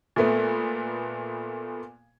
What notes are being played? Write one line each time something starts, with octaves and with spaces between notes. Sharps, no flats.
A#2 A3 B3